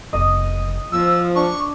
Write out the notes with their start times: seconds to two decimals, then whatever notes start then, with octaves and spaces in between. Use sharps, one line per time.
0.13 F1 B2 D#5
0.92 F3 B3 E6
1.35 D4 C#6